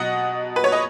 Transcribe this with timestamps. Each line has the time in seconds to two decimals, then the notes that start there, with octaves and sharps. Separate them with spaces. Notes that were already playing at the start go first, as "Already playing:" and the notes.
Already playing: B2 F#3 D#5 F#5
0.56 B4
0.64 C#5
0.72 D#5